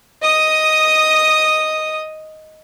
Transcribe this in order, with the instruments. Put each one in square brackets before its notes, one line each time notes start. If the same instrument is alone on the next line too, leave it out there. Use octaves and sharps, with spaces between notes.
[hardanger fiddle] D#5 D#6